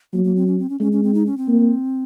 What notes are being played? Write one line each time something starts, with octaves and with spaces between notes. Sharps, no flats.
F#3 A#3
A#3
C4
C#4
C4
C#4
G#3 C#4
C#4
C4
D#4
C#4
C4
A#3